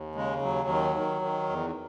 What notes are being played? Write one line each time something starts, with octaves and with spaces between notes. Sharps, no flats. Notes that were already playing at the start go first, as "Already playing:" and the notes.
Already playing: D#2
C#3 G#3
D#2 F#3
D#3
D#3
D#3
E2